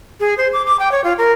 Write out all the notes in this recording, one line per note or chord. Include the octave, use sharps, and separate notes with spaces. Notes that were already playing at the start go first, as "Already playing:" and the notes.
G#4
C5
D6
D6
G5
C#5
F4
A#4